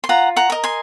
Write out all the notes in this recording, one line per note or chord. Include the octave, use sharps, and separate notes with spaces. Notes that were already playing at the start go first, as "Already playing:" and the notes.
C6
F4 F#5 A#5
F#5 A#5
A#4 D#5
G#5 C6